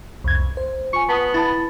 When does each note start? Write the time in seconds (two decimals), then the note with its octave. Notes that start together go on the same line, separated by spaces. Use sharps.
0.24 C2 F2 G#6
0.57 C5
0.93 F4 G#5 C#6
1.09 B3 A5 D#6
1.34 E4 A5 B5 A6